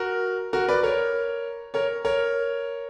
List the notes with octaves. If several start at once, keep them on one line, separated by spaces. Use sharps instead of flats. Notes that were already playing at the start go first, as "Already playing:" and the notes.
Already playing: F#4 A#4
F#4 A#4
B4 D5
A#4 C#5
A#4 C#5
A#4 C#5